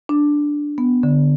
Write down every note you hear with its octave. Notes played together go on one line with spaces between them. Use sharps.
D4
B3
D3